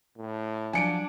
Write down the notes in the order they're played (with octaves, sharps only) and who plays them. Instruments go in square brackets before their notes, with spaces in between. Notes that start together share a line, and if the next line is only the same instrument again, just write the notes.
[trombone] A2
[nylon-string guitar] F3 F#3 [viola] D4 [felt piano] G#5 C#7 D7